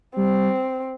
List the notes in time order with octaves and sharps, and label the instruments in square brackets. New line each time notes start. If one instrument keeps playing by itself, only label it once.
[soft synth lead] G3 [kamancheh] C4